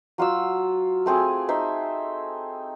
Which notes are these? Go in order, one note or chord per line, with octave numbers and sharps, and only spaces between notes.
F#3 F4 F#5 E6
A3 C4 G#4 G#5
D#4 C5 E5